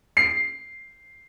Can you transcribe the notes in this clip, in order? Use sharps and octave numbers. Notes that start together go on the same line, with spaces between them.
C7